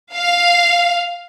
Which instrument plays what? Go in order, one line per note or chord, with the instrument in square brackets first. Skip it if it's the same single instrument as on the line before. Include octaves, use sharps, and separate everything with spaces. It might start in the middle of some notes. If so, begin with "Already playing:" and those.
[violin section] F5